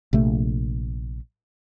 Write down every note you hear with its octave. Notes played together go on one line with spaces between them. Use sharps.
A#1 C3 A3